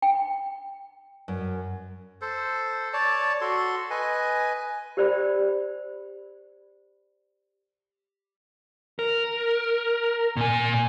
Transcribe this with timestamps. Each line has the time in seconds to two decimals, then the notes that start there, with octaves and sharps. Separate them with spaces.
0.02 G5
1.28 F#2
2.21 A4 C5
2.93 C#5 D5 A5
3.41 F#4 A4 C6
3.90 B4 D#5 G#5
4.97 G4 A#4 C5 D5 G5 B5
8.99 A#4
10.37 A#2 G#5